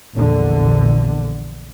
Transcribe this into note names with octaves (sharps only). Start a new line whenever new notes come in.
A#1 E2 D3